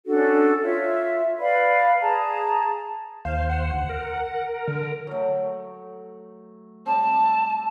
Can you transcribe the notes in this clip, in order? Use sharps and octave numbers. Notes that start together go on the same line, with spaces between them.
C#4 D4 F#4 A4
F4 C#5 E5
B4 D5 F5 B5
G#4 A5 A#5
D#2 C5 F5
F#5
D2
A#4
D3
F#3 A3
G3 C4 A5